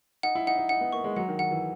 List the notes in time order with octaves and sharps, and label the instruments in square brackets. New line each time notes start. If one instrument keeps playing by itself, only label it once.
[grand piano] D#4 [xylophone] F#5
[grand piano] E4
[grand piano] D#4 [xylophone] F#5
[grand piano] D#4
[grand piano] D#4 [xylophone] F#5
[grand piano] B3
[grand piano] A#3 [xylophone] C#6
[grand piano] G#3
[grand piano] F#3 [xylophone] F#5
[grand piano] D#3
[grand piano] D#3 [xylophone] F#5
[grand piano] E3